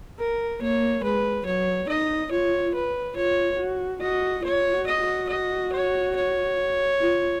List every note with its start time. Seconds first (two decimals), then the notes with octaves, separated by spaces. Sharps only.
0.19 A#4
0.61 A#3 C#5
1.03 G#3 B4
1.46 F#3 C#5
1.89 D#4 D#5
2.31 F4 C#5
2.75 B4
3.16 F4 C#5
3.59 F#4
4.01 F#4 D#5
4.44 F4 C#5
4.73 F#4
4.87 D#5
5.02 F#4
5.29 D#5
5.73 C#5
6.15 C#5
7.00 F4